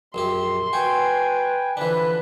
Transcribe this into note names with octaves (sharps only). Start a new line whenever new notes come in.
A#1 F#2 G4 C6
F#4 B4 G5 G#5
D3 E3 F3 D4 B4